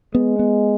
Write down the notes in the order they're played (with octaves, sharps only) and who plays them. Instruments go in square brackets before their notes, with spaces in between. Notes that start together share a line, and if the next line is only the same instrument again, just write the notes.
[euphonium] G#3 [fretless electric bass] B3
[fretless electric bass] B3